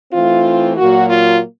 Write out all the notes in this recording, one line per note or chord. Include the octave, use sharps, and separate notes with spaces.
E3 A3 C4 F4
A#2 F#3 A#3 F#4
F4